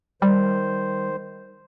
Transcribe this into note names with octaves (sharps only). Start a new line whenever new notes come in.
D#3 G3 C5